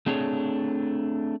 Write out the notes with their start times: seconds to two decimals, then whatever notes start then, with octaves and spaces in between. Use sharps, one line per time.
0.06 A3 C4 D4 G#4 C5 C#5